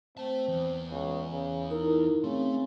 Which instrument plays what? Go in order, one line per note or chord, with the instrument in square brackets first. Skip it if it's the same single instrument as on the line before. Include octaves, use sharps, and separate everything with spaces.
[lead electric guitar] A3 A5 [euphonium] C4
[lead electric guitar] E2
[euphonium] C#2
C#3
[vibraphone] D#4 E4 [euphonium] A#4
[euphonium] C#3 [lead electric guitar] A3 [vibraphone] C4